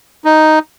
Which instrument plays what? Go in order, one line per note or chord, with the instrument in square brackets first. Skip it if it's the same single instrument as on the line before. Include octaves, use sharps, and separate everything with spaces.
[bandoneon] D#4